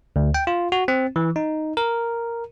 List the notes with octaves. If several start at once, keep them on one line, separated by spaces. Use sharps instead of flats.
D2
G5
F4
F#4
C4
E3
D#4
A#4